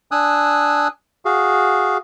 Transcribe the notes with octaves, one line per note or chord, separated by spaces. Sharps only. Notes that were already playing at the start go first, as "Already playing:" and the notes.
D4 G#5 D#6 E6 F#6
F#4 G#4 F5